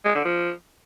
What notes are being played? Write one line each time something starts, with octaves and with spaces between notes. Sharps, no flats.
G#3
D3
F3